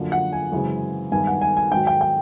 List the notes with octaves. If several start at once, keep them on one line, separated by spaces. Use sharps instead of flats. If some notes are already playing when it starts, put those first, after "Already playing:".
Already playing: F#2 D3 F3 A#3
F#5
G#5
F#2 C#3 E3 G#3 C4
G2 D#3 G#3 B3 G#5
F#5
G#5
G#5
G#2 D#3 F#3 G5
G5
G5